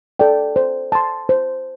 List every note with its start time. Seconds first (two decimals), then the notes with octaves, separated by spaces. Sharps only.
0.19 A4 D5 G5
0.56 C5
0.92 A5 C6
1.29 C5